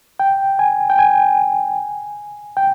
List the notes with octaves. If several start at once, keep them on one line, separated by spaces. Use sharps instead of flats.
G5
G#5
G5
G#5
G5